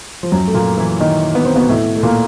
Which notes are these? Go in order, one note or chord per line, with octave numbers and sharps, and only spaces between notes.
F3
F#2 F#3
A3
A#2 A#3
E3 E4
D#3 D#4
B3
C4
B2 B3
A2 A3
A3
A#2 A#3